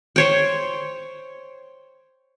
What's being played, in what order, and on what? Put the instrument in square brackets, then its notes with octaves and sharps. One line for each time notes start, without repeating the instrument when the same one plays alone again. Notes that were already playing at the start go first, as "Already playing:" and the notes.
[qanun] C5 C#5 G5